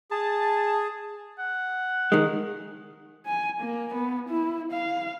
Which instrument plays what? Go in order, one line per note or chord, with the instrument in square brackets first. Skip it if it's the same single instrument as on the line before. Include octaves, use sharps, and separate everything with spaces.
[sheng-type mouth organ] G#4 [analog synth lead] A5
[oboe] F#5
[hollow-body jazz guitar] D#3 G#3
[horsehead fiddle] G#5
A#3
B3
E4
F5